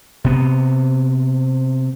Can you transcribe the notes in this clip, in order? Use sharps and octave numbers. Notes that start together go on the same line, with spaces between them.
C3 B3